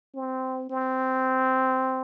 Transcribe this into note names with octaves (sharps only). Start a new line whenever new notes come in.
C4
C4